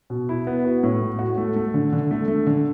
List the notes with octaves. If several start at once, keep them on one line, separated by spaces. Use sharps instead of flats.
B2
E4
B3
F#4
A2
A3
F#4
A3
A3
D3
D3
A3
A3
D3